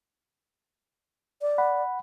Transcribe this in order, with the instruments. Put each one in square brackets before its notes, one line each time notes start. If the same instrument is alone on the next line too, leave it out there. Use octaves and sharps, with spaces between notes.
[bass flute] D5
[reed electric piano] F#5 B5